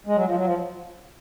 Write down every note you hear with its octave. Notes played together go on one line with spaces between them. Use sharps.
G#3
F#3
F3
F#3
F3